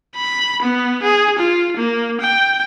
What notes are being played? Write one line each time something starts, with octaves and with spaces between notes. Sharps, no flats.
B5
B3
G#4
F4
A#3
G5